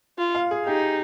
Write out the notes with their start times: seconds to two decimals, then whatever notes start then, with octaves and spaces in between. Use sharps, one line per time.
0.18 F4
0.35 F5
0.51 G#4
0.67 D#4 G4